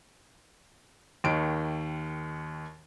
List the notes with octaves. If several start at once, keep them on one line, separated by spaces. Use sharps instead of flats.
D#2 D#3 D7